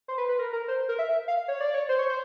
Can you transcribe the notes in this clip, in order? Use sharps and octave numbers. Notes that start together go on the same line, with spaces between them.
C5
B4
B4
A#4
A#4
C5
A#4
E5
F5
C#5
D5
C#5
C5
C#5
C5